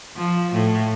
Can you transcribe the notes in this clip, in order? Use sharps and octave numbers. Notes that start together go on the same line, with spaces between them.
F3
A2